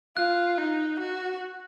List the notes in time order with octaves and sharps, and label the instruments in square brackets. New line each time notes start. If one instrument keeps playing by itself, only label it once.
[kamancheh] F4 [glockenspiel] F#6
[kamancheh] D#4
F#4